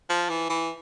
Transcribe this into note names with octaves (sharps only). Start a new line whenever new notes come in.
F3
E3
E3